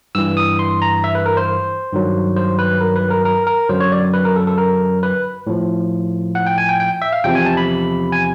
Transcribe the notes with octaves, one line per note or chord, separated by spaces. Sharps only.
G2 E3 E6
D#6
C6
A#5
E5
B4
A#4
C5
G2 D#3 F#3
C5
B4
A#4
B4
A#4
A#4
A#4
F#2 D3 F#3 C5
C#5
D5
B4
A#4
A4
A4
A#4
B4
A2 F3
F#5
G5
G#5
G5
G5
E5
F5
E2 C3 F3 G5
G#5
A5
B5
G#5